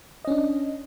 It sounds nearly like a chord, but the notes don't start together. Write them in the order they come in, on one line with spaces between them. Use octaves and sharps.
D#5 C#4 D4